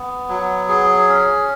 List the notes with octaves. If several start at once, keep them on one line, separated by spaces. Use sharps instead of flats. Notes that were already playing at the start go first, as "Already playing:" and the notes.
Already playing: B3
F#3
G#4
C#4